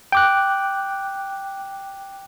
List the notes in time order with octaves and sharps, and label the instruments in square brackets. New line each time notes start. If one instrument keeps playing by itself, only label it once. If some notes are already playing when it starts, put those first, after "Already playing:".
[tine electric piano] G5 D6 F#6